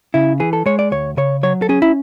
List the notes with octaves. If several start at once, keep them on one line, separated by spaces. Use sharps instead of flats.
C#3 E4
E3 G#4
A4
G#3 C#5
D5
D2 C#5
C#3 C#5
F#3 C#5
A4
C#4 G#4
E4